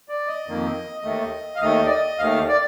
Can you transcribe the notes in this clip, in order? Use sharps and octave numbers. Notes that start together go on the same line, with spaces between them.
D5
D#5
F2 D#3 A#3
D#2 D#3 A3
F5
D#2 D#3 A3 D#5
D5
D#5
D#2 D#3 A3 F5
D5